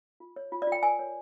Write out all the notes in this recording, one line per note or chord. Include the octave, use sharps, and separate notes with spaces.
F4
C#5
F4
D5
F4
G5
A#4 G#5
C#5